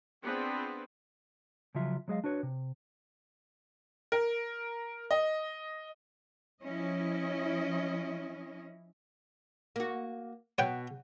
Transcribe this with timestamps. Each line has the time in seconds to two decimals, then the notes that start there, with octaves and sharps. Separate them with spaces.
0.24 B3 C4 D4 F4 G#4 B4
1.75 C#3 F3 F#3 F4 E5
2.08 F#3 G#3 G#4 B4 D#5 F5
2.24 D4 F#4 B4 C#5
2.43 C3
4.12 A#4
5.11 D#5
6.63 F3 C#4 E4 D#5
9.76 A#3 F#4
10.58 B2 C#5 F#5 G5